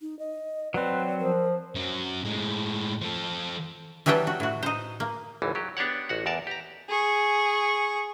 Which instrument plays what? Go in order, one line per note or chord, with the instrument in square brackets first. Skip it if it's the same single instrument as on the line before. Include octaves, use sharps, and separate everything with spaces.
[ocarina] D#4
D#5
[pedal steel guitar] F#3 C4 [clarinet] B4 [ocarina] D5
[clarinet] F3 [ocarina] A#4
[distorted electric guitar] F#2 F#3
A2 G#3
F3 A4
[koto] E3 F#3 G3 E5 G5 A5
F#4
A2 F#4
D#4 C5
A#3
[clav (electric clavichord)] G#1 C#2 E3
F#3 G4
B3 D4 G4 C#5 F#5
A1 F#4 F#5
E2 A#4 D5 A5
G4 A#5
[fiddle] G#4 C#6